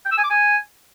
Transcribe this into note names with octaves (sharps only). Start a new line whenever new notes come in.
G5
E6
G#5
D6
G#5